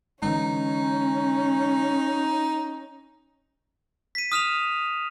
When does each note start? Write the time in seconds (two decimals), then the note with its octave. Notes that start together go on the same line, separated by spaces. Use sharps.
0.22 D3 E3 G#3 C#4 D#4
4.15 B6 D#7
4.32 D#6 F6 E7 F7